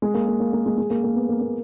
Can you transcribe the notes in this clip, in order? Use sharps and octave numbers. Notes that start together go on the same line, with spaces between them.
G#3
A#3
A#3
A#3
A#3
G#3
G#3
A#3
A#3
B3
A#3
A#3